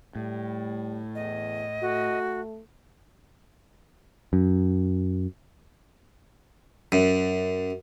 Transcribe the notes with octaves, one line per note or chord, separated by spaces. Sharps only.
A2 G3
E2 D#5
A3 F#4
F#2
F#2